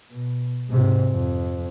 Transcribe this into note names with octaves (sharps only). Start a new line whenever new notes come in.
B2
G#2 C3
F2